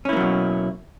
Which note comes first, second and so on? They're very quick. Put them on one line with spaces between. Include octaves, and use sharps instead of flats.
C#4 E4 A#3 F#3 B2